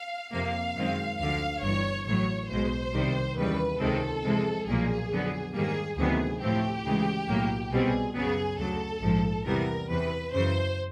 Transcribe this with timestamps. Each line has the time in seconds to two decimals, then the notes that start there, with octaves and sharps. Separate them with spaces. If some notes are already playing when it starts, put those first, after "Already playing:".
Already playing: F5
0.32 F2 C3 F3 A#3 F5
0.75 F#2 D#3 G#3 C4
1.18 D2 D3 F3 F5
1.63 G1 G2 E3 C#5
2.06 A1 A2 F#3 C#5
2.49 B1 B2 G#3 C5
2.92 C2 C3 D#3 G3
3.36 D#2 C#3 E3 G3 B4
3.80 C#2 C3 D#3 G#3 C4 A4
4.23 F2 C3 E3 G#3
4.67 B1 A#2 F3 A#3 G#4
5.10 F2 D3 F#3 B3
5.54 G#2 D#3 G3 A#3 G#4
5.97 D2 C3 D#3 F#3 B3 G#4
6.40 A2 F3 A3 C4 G4
6.84 D2 C#3 E3 G#3
7.27 B1 A2 F#3 A#3
7.71 C2 B2 G3 C4 G#4
8.15 F#2 C#3 F#3 B3 G#4
8.58 D2 C#3 F#3 A4
9.02 A#1 G#2 F3
9.45 E2 C3 E3 G3 B3 A#4
9.88 E2 C3 E3 B4
10.33 F#2 C#3 E3 C5